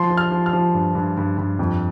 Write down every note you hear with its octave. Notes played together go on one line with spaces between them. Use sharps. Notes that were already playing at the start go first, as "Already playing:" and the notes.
Already playing: F3 C6
F3
F6
F3
F6
F3
G2
G2
G2
G2
F2